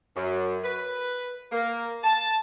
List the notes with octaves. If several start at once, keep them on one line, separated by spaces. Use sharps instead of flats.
F#2
B4
A#3
A5